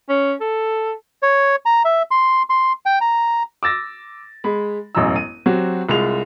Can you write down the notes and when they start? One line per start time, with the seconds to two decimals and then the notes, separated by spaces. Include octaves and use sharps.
0.09 C#4
0.41 A4
1.23 C#5
1.66 A#5
1.85 E5
2.11 C6
2.50 C6
2.86 G5
3.01 A#5
3.63 D6 E6 A6 A#6
4.44 G#3 B5
4.95 E1 A1 F#2 D#5 A#5 E6
5.16 D#7
5.46 F#3 C4 F#4 G4
5.89 C2 G#3 F4 F7